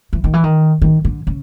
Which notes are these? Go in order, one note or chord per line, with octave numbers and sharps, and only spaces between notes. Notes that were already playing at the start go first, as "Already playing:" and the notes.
E3
D#3
E3
D#3
D#3
D3
C#3